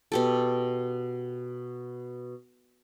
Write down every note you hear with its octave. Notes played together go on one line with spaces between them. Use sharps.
B2 G4 A4